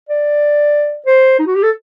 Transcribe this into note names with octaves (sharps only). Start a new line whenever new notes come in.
D5
C5
D#4
F#4
G4
A4